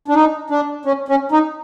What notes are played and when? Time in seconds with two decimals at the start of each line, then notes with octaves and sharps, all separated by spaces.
0.08 D4
0.15 D#4
0.50 D4
0.85 C#4
1.08 C#4
1.32 D#4